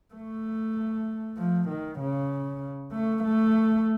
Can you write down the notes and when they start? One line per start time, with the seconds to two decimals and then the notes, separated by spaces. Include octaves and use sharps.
0.14 A3
1.37 F3
1.69 D#3
1.99 C#3
2.93 A3
3.24 A3